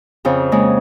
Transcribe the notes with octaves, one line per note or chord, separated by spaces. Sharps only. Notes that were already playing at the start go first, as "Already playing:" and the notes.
F2 C#3 F4
C#3 G#3 A#3